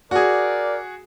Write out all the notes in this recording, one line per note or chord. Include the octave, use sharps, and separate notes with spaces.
F#4 G#4 A#4 D5